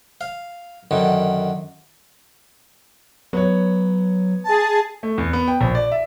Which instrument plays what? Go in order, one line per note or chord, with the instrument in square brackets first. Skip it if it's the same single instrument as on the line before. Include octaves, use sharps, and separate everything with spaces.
[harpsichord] F5
F#2 D3 D#3
[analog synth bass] F#3 [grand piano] B3 C#5
[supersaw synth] G#4 A5
[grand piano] A3
E2
B3
G5
A#1
D5
E5